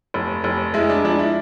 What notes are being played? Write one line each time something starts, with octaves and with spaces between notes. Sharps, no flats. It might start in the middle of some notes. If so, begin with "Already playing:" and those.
F1
F1
G#3 E4
D4
F3 D4
E4